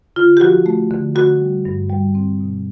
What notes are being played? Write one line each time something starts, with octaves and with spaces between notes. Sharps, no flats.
D3 F4
G4
F3 F#4
A3
D3
D3 F#4
G3
G2
G3
C4
B2